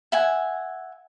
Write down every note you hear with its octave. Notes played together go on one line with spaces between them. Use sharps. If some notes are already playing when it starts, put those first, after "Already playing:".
E5 F#5 G#5